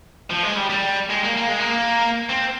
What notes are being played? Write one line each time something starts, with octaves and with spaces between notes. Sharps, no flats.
F3
G#3
G3
G3
G#3
A#3
A#3
G#3
A#3
C4